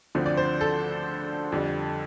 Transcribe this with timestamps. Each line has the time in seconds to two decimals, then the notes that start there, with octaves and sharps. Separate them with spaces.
0.15 D2 D3 F3 C4
0.26 D5
0.37 C5
0.61 A4
1.52 F2 D3 G3